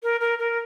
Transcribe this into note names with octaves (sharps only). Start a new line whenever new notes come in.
A#4
A#4
A#4